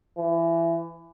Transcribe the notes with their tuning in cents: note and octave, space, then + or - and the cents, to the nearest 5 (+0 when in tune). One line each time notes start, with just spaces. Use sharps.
E3 +25